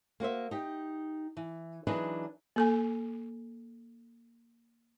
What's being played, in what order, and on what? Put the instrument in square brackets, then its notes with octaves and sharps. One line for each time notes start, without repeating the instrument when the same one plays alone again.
[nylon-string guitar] A#3 F#4 C5 E5
D#4 G4
E3
E3 F#3 D4 D#4 G#4 B4
[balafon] A#3 A4 G#5